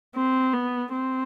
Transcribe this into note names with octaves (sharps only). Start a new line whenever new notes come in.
C4
B3
C4